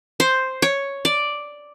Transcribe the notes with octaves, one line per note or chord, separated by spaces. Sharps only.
C5
C#5
D5